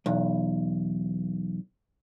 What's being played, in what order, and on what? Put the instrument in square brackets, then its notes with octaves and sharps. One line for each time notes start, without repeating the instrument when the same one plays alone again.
[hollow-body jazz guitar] B1 E2